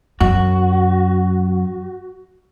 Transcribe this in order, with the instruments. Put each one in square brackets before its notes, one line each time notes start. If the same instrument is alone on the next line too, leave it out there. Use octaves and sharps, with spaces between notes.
[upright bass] F#2 [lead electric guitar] F#4